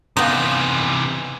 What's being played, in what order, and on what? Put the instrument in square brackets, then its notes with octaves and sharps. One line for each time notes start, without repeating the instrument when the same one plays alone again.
[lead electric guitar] C3 E3 [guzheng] B3 D#4